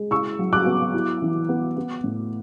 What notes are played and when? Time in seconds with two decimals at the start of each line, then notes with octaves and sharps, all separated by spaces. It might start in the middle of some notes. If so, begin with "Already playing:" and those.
Already playing: G#3
0.11 E4 C#6 E6
0.39 F#3
0.53 D6 F#6
0.66 B3
0.94 E4
1.22 E3
1.49 B3
1.77 B3
2.04 A2